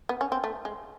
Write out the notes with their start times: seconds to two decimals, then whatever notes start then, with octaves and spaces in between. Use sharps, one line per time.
0.09 B3
0.21 C#4
0.32 C4
0.44 A3
0.65 G#3